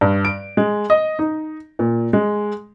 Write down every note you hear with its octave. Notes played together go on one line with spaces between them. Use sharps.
G2
D7
G#3
D#5
D#4
A#2
G#3